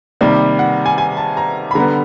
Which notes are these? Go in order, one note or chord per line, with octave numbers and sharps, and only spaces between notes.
C3 D#3 G3 A#3 D5
F#5
G#5
G#5
A5
A#5
B5
D3 G3 B3 A#5